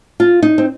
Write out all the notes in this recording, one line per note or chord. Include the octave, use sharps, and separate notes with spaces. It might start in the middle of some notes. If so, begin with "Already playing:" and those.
F4
D#4
C4